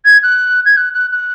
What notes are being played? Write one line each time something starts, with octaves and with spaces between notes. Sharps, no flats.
G#6
F#6
G#6
F#6
F#6
F#6